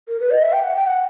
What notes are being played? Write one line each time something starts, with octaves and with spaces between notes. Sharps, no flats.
A#4
B4
D#5
E5
G5
F#5
G5
F#5